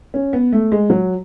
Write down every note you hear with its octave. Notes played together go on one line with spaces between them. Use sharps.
C#4
B3
A3
G#3
F#3